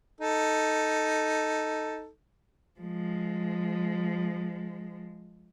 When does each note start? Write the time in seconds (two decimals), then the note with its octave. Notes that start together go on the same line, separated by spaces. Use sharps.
0.21 D#4 A4
2.80 F3 G#3